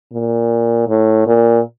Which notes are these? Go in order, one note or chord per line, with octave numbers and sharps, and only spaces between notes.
A#2
A2
A#2